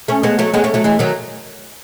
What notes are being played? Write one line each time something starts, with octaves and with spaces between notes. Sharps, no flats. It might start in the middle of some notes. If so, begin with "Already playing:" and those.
A3 C#4
G#3 B3
F#3 A3
G#3 B3
A3 C#4
F#3 A3
E3 G#3
D#3 F#3